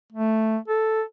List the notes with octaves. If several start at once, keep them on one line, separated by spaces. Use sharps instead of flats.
A3
A4